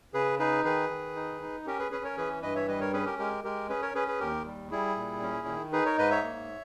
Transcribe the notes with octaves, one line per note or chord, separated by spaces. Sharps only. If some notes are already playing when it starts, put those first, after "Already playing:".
C#3 G#4 B4
D#4 G#4 B4
D#3 G#4 B4
D#3
D#4
D#4
C#4 G4 A#4
G#4 B4
C#4 G#4 B4
A#4 C#5
E3 G#4 B4
G2 B4 D#5
C#5 E5
G3 B4 D#5
A#4 C#5
C#4 G#4 B4
G4 A#4
G#3 G4 A#4
G#3 G4 A#4
C#4 G#4 B4
A#4 C#5
C#4 G#4 B4
G#4 B4
D#2 G4 A#4
G3
G3 E4 G#4
A#2
C#4
D#3
D#4 G#4 B4
A#4 C#5
G#2 B4 D#5
C#5 E5
A#3